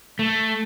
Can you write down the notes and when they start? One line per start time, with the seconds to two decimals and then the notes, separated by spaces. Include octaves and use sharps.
0.19 A3